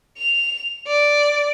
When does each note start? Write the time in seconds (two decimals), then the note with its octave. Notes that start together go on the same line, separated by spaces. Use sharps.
0.18 F7
0.87 D5